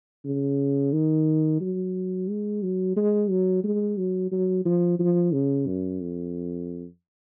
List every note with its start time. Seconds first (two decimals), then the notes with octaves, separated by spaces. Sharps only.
0.25 C#3
0.93 D#3
1.61 F#3
2.28 G#3
2.63 F#3
2.96 G#3
3.30 F#3
3.64 G#3
3.97 F#3
4.32 F#3
4.65 F3
4.99 F3
5.33 C#3
5.67 F#2
6.01 F2